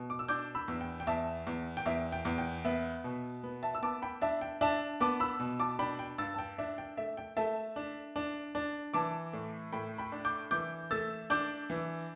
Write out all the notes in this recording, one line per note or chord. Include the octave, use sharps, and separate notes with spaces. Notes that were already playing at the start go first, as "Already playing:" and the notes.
Already playing: B2
D6
E6
D4 D6 G6
B5 E6
E2
G5
G5
E2 E5 A5
E2
G5
E2 E5
G5
E2
G5
B3 E5
B2
B3
E5 A5
E6
B3 A5 D6
G5 B5
D4 E5 A5
G5
D4 E5 A5
B3 A5 D6
B5 E6
B2
A5 D6
D4 G5 B5
G5
G2 E6 A6
A5
G5
D4 E5
G5
A3 E5
G5
A3 E5 A5
D4
D4
D4
E3 A5 D6
A2
A2 G5 B5
G5 B5
D4
D6 G6
E3 D6 G6
A3 E6 A6
D4 D6 G6
E3